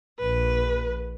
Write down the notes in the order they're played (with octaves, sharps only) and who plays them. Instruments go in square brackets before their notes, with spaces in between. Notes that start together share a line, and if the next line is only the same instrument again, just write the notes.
[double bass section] A#1 [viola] B4